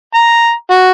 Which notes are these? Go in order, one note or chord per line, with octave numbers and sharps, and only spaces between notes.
A#5
F#4